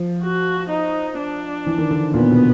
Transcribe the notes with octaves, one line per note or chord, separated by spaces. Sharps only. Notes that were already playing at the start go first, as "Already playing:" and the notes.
Already playing: F3
F#4
D#4
D4
E3
D#3
D3
A#2 B3
B2